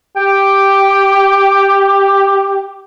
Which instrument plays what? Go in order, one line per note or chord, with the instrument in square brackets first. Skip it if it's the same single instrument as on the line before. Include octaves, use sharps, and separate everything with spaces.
[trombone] G4 [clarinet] G5